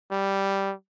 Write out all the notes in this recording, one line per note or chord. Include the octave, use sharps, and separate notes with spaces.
G3